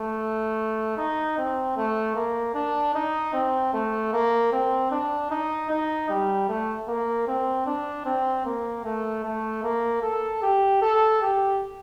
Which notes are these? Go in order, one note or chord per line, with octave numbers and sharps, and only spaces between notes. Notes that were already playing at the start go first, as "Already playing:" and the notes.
Already playing: A3
D#4
C4
A3
A#3
D4
D#4
C4
A3
A#3
C4
D4
D#4
D#4
G3
A3
A#3
C4
D4
C4
A#3
A3
A3
A#3
A4
G4
A4
G4